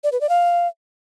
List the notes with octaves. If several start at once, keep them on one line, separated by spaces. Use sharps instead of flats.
D5
B4
D5
F5